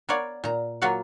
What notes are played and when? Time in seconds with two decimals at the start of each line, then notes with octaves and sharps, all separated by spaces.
0.09 B3 A#4 C#5 D5 F5
0.44 A#2 A#5
0.82 F#3 A#3 F4 F#4 F5 F#5